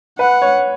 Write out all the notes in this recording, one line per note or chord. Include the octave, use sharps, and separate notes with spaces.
B4 F#5
C#5